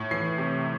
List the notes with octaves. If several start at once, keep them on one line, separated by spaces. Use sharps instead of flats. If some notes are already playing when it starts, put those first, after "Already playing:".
Already playing: A2
E3 C7
C3